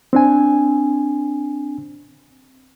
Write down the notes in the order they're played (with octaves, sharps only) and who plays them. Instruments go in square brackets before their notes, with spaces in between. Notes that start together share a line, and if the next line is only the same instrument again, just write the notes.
[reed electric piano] C4 D4 G#5